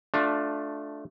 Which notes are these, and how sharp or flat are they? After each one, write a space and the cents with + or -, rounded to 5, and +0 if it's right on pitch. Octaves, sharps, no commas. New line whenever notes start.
A3 -10 D4 +0 F4 +20